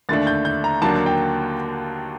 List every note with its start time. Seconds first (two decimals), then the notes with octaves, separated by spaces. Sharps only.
0.09 D#2 D3 A3 D4 A6
0.27 G6
0.45 G6
0.64 A#5
0.82 D#2 D3 F#3 A#3 D4 A5
1.06 G5